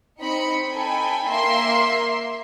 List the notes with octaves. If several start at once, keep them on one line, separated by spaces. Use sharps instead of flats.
C4 D#4 B5 C#7
D#4 A4 G5 G#5 B5
A#3 A#4 E5 C6 C7